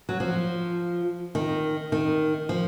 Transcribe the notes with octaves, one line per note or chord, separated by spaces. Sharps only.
F#3
F3
D#3
D#3
F3